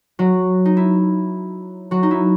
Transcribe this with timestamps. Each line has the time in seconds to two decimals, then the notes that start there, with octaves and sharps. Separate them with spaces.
0.19 F#3 F#4
0.65 D#4
0.77 E4
1.91 F#3 F#4
2.03 D#4
2.11 E4